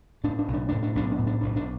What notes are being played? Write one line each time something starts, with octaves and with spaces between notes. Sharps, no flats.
A2 D4
D4
B1
D4
D4
A2
D4
B1 D4
D4
A2
D4
B1 D4
D4